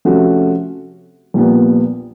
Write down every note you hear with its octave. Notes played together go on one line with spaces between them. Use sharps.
C3 F3 A3 C#4 F#4
A#1 A#2 G3 B3